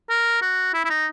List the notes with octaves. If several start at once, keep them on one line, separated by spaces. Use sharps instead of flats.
A#4
F#4
E4
E4
D#4